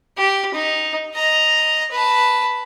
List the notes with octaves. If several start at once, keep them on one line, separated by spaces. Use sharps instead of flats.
G4
D#4
D#5 A#5
B4 A5